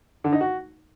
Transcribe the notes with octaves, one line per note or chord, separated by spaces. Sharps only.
D3
D#4
F#4